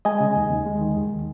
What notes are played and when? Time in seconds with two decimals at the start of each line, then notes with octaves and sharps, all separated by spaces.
0.05 G#3 D#5 G#5
0.20 C#3
0.36 D#2
0.50 D#2
0.66 G#3
0.81 D#3
0.96 D#2